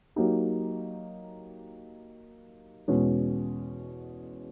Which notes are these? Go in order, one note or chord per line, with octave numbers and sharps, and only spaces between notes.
F#3 A#3 D#4 G4
E2 B2 G#3 C#4 F#4